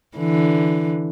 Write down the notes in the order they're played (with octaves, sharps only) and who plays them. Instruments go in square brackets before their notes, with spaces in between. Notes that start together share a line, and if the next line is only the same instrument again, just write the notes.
[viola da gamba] D3 E3